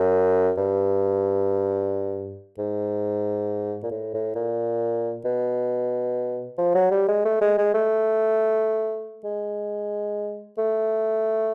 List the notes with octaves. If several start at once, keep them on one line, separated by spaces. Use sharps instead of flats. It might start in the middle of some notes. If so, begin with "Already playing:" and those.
Already playing: F#2
G2
G#2
A#2
A2
A2
A#2
B2
F3
F#3
G3
G#3
A3
G#3
G#3
A3
G#3
A3